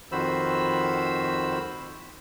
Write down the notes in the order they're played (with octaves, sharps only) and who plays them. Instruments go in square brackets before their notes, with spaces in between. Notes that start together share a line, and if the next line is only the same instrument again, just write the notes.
[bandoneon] F2 D#3 F#4 C5 B5 E6